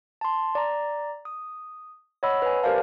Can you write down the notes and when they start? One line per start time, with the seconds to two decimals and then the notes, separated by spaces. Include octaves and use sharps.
0.21 A5 C6
0.55 D5 A#5
1.25 D#6
2.23 C#5 D#5 F#5 B5 E6
2.42 B4 G#5
2.63 G4 A#4 C5 D5 F5 A5